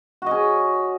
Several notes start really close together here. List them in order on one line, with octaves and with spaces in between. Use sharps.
F#4 D#5 C#4